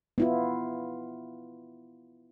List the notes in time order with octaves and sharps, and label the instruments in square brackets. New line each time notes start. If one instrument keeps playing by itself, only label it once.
[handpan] B3 E4 F4